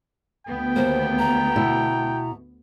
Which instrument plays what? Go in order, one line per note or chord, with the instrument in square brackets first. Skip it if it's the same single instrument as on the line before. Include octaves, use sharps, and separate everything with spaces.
[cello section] D2 B3 [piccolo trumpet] G5
[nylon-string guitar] D#2 A#3 [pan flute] C5
[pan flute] A#5
[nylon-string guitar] B2 E4